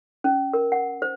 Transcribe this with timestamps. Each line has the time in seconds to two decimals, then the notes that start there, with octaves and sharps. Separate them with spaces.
0.24 C#4
0.53 A#4
0.72 F#5
1.02 C5